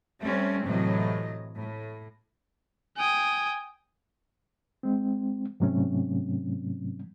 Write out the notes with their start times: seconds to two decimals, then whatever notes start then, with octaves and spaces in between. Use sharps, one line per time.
0.20 G3 A3 C4 C#4
0.64 A2 C3 E3 F#3 D#5
1.57 A2
2.97 G5 G#5 D#6
4.83 G#3 C4
5.60 G#2 C3 F#3 A3 C4 C#4